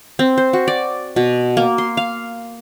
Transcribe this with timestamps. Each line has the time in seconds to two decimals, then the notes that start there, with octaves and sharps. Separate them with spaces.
0.19 C4
0.38 C5
0.53 F#4
0.68 D5
1.16 B2
1.57 A#3
1.78 C6
1.97 F5